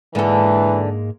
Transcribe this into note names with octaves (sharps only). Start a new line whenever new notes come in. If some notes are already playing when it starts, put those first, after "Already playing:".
G#2 D3 E3 G#3 A#3 A4